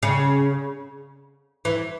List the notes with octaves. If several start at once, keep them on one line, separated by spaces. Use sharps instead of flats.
C#3
E3